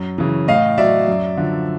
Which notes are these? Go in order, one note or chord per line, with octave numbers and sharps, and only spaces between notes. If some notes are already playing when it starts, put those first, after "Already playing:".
Already playing: F#2
C#3 E3
A2 D#5 F5
F#3 D5 E5
F#2
D3 F3